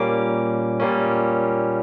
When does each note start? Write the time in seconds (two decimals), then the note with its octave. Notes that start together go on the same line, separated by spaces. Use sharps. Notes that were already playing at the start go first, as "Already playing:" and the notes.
Already playing: A#2 G3 A#3 C#4 D6
0.80 A#2 G3 A#3 C#4